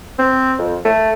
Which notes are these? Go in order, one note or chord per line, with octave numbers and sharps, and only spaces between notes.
C4
F2
A3